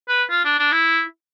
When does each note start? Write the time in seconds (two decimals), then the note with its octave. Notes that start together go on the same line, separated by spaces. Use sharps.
0.08 B4
0.30 F4
0.45 D4
0.59 D4
0.72 E4